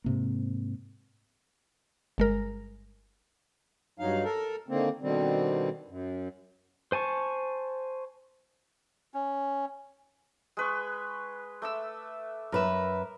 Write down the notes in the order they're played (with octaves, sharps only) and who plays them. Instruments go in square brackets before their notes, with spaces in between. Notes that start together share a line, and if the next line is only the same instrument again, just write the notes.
[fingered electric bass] G#2 C3 A#3
[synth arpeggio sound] G1 G#3 A#4
[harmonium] G2 F#3 D#4 F5
A4 A#4
D3 D#3 A#3 C4
B2 D3 D#3 G3 C4
F#2
[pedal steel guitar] C5 G#5 A5 C#6
[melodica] C#4
[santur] G#3 B4 C#6
A3 D6 E6
[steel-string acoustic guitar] F#2 B4 E5 [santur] A#4